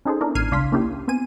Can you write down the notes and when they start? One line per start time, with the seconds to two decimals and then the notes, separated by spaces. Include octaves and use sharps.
0.05 C#4 D#4 G#4 A4 C5
0.21 B3 D4 E4 A#4
0.35 A1 F6 G#6 C7 D#7
0.51 C#2 D4 F5 C6 B6
0.72 A#3 C#4 D4 E4 G4
1.08 B3 C4 G#5 D#7